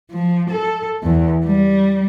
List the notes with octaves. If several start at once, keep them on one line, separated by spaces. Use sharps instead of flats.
F3
A4
E2
G3